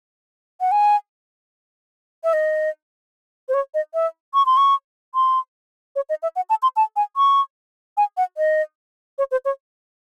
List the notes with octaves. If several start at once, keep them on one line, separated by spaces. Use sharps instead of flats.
F#5
G#5
E5
D#5
C5
C#5
D#5
E5
C#6
C6
C#6
C6
C#5
D#5
E5
F#5
A5
C6
A5
G#5
C#6
G#5
F#5
D#5
C#5
C5
C#5